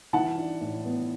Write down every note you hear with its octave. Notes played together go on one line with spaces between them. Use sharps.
E3 F#5 A5
D4
A2
B3